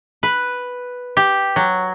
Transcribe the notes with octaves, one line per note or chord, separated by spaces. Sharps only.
B4
G4
F#3